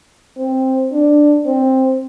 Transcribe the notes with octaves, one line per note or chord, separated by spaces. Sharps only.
C4
D4
C4